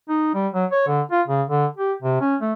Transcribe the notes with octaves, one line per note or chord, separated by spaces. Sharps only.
D#4
G3
F#3
C#5
D3
F4
C#3
D3
G4
C3
C#4
A3